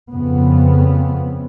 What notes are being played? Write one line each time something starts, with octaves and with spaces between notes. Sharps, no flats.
F2 C#3 B3